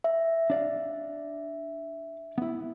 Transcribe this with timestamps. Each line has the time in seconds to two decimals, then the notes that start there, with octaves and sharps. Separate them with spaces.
0.04 E5
0.50 D4 D5 F5
2.38 B3 E4